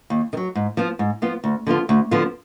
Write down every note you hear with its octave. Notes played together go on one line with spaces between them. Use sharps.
D#2
D#3
F#3
G#2
F3 B3 F4
G#2
F3 B3 F4
D2
D3 F3 B3 F4
D2
D3 F3 B3 F4